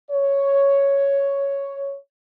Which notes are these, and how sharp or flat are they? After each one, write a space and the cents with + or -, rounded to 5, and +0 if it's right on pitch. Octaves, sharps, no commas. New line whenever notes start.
C#5 +5